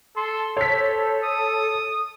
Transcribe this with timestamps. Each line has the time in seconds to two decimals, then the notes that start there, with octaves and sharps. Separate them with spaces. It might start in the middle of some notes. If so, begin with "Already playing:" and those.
0.16 A4 C6
0.57 A4 C5 C#5 B6
1.24 D#6